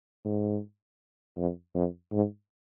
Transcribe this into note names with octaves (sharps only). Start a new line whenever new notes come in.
G#2
F2
F2
G#2